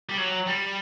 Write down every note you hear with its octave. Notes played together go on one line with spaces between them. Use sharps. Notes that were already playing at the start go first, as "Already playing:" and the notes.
G3
F#3
G3